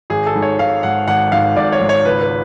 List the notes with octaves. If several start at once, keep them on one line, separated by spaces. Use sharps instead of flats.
G#1 G#4
A4
G#2
C#5
G#1 F5
G#2 F#5
G#1 F#5
G#2 F5
G#1 D5
C#5
G#2
C#5
C#2 B4
B4